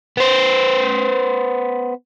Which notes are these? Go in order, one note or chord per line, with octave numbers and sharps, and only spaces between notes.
B3 C5